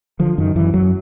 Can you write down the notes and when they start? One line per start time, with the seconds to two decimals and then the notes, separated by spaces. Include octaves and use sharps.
0.20 D3 F3
0.38 F#2 D#3
0.56 F#2 E3
0.74 F#2 F#3